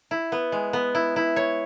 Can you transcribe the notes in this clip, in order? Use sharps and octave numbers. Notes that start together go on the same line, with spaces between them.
E4
B3
G#3
B3
E4
E4
C#5